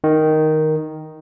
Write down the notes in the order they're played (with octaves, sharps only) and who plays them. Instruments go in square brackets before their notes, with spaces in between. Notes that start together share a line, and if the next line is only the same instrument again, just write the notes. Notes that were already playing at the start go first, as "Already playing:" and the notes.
[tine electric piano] D#3